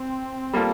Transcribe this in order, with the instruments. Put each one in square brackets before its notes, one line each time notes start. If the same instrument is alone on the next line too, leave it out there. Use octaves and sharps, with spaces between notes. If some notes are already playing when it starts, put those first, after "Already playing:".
Already playing: [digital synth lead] C4
[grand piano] G3 A#3 F4 A4